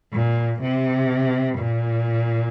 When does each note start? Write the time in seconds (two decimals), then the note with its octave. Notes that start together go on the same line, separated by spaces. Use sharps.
0.13 A#2
0.62 C3
1.58 A#2